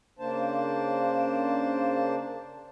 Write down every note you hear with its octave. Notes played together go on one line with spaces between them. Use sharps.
C#3 A#3 D4 C5 A5